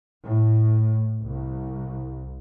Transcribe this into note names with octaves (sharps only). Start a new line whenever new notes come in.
A2
C2